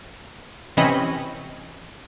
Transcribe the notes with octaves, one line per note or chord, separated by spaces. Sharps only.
C3 E3 C4 C#4 D#5 B5